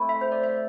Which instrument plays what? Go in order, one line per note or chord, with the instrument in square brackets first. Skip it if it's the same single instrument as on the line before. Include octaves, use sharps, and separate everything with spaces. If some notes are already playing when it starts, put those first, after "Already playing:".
Already playing: [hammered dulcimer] A3 C4 E4
[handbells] E5
C5
D5
E5